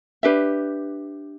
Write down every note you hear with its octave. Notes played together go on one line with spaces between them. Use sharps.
D4 G4 B4 E5